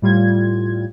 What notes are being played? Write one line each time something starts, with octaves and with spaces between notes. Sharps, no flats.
A2 G3 F4 G#6